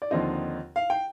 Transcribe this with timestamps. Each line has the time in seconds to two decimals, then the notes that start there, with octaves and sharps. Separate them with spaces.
0.02 D5
0.11 D#2 D3 F3 C4 D#4 D#5
0.76 F5
0.90 G5